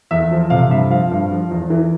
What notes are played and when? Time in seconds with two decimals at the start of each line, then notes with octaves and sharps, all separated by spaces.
0.11 E2 E5
0.31 F3
0.50 C3 F5
0.70 G2 E5
0.90 F3 F5
1.11 G2
1.31 F3
1.51 E2
1.70 E3